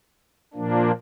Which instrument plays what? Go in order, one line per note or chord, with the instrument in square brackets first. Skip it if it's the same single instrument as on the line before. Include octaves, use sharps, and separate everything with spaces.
[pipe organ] A#2 F3 A#3 D4